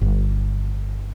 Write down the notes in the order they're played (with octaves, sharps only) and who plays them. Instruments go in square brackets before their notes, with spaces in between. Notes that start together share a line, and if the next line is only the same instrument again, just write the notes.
[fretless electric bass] G1